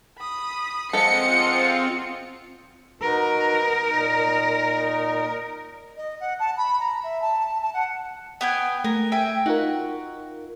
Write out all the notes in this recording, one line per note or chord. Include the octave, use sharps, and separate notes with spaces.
B5 D#6
F3 G#3 C4 F4 A4 D#5 F#5 C#7
D#4 F#4 A#4 B4
A#2 D#4
D#5
F#5
A5
B5
A#5
E5
A5
A5
F#5
B3 G5 G#5
A3 A#4
E5 G5 G#5
D#4 F4 F#4 A#4